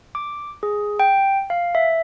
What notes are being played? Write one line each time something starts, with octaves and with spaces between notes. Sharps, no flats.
D6
G#4
G5
F5
E5